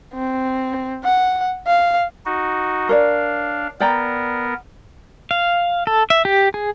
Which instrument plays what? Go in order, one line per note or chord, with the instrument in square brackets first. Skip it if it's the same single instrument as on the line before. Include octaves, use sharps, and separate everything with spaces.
[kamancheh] C4
F#5
F5
[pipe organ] D#4 F#4
[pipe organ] D4 F5 [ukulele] A#4 C#5 D5
[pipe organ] B3 A#4 [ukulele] D5 G5 A#5
[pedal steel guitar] F5
A4
E5
G4
G#4